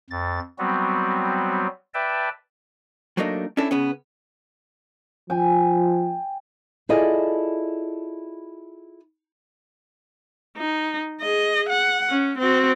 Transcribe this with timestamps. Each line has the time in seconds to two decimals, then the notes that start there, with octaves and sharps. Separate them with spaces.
0.10 F2 A6
0.59 F#3 G3 B3 C4 F#4
1.94 B4 D5 E5 G5 A5
3.17 F#3 A3 A#3 D4 D#4
3.57 C#4 D4 E4 A4
3.71 C#3 B3 C#4
5.30 F3 G5 G#5
6.89 E4 F4 G#4 A4 D5 D#5
10.57 D#4
11.20 G#4 D#5
11.69 F#5
12.09 C#4
12.38 C4 F#4